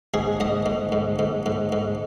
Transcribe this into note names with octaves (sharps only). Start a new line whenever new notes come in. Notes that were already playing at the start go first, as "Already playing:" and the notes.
G#2 G#4
G#2 D#5
G#2
G#2
G#2
G#2
G#2